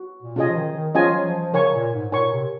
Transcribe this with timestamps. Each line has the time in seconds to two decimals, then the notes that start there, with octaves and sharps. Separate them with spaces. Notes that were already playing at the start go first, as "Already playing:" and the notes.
Already playing: F#4
0.22 A#2
0.36 C3 C#4 F4 G#4 D#5 G#5
0.49 F3
0.56 D#3
0.75 D#3
0.95 F3 C#4 F4 G#4 D#5 G#5
1.10 F#3
1.24 F3
1.39 F3
1.54 C#3 A#4 C#5 G#5 C#6
1.74 A#2
1.93 G#2
2.12 A#2 A#4 C#5 G#5 C#6
2.31 C3